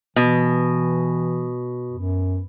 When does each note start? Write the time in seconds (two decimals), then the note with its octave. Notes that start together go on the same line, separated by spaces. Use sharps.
0.16 B2 E3
1.92 F#2